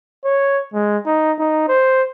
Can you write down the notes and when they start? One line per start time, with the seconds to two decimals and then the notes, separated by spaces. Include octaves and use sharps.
0.25 C#5
0.74 G#3
1.06 D#4
1.39 D#4
1.68 C5